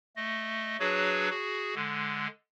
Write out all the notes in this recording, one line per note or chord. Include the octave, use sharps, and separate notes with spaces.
A3 D#5
F#3 D4 F#4 G#4 B4 C#5
F#4 G#4
D3 G#3